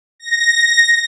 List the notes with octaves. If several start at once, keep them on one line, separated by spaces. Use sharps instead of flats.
A#6